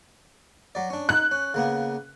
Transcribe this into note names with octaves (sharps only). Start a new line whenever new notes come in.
F#3 D5
C#4 D4
D#4 F#6
C#4
C#3 A#3 B3